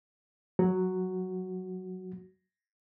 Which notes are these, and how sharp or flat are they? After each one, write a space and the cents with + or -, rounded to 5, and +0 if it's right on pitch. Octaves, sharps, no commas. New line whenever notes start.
F#3 +0 F#4 +0